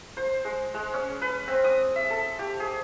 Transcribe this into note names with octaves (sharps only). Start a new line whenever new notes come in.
C5
G#3
G#3
C#4
B4
C4
D#6
E5
A4
G4
G#4